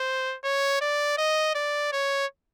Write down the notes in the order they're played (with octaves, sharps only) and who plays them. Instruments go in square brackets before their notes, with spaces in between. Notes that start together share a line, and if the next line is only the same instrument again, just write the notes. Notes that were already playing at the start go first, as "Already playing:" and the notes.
Already playing: [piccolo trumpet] C5
C#5
D5
D#5
D5
C#5